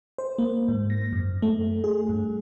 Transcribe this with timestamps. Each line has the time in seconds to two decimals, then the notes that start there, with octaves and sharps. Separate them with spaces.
0.18 C5
0.38 A#3
0.68 G#2
0.90 A#6
1.13 F#2
1.42 A3
1.84 G#4
2.09 G2